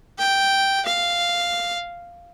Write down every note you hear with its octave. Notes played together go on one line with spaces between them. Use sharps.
G5
F5